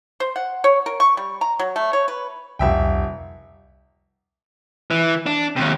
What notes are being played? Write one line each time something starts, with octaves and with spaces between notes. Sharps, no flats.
C5
F#5
C#5
A#4
C#6
G3
A#5
F#3
A3
C#5
B4
D#1 C2 F2 E5 G5
E3
D4
D#2 C3